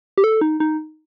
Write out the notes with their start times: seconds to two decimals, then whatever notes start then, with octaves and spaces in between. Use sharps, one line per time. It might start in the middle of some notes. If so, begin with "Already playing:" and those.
0.18 G4
0.24 A4
0.41 D#4
0.60 D#4